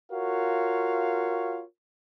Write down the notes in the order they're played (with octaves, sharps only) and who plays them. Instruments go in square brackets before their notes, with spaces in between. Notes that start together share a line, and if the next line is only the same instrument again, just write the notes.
[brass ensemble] F4 F#4 A#4 C#5 F5